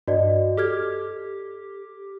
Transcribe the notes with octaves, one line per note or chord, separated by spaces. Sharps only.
G2 F#4 D5 D#5
G4 A4 F6 G#6